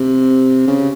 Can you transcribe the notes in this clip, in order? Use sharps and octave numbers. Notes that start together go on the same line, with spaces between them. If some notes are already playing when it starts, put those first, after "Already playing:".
Already playing: C3
C#3